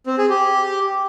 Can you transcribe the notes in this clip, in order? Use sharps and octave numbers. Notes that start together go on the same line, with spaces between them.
C4
G#4
G4